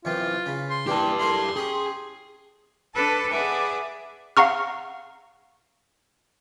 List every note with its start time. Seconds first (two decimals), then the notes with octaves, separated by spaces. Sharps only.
0.05 F#2 C3 E3 F4
0.46 C#3 B5
0.70 C6
0.87 E3 G3 A#3 G4 A5
1.19 E4 A4 A#4 C6
1.56 C#4 G4 G#4
2.94 D4 A4 B4 A5
3.29 G#4 B4 D5 E5 F#5 G#5
4.37 F5 F#5 A#5 C#6 F6